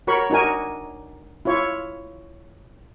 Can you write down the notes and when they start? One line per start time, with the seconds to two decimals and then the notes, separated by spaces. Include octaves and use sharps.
0.07 F#4 A#4 C#5 B5 C#6
0.30 D4 D#4 F#4 A#4 G#5
1.45 E4 F4 C#5